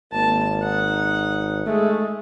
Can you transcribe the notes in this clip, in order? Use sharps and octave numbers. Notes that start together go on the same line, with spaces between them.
G#1 A#3 A5
D#4 F#5
G#3 A3